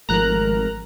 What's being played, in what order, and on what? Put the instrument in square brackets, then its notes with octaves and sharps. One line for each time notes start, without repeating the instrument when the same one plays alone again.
[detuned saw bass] G#1 [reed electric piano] F3 G#3 A3 [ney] A#4 [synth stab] A#5 F#6